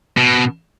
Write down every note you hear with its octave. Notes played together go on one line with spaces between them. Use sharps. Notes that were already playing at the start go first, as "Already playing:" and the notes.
B2